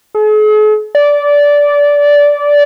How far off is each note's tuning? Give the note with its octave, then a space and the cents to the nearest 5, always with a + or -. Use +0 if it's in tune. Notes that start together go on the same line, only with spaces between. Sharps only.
G#4 +45
D5 -15